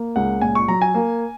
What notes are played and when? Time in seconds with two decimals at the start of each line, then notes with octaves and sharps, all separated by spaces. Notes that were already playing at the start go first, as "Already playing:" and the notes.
Already playing: A#3
0.16 C#2 F#5
0.41 A#2 G#5
0.55 C#6
0.68 F#3 A#5
0.82 G#5
0.94 A#3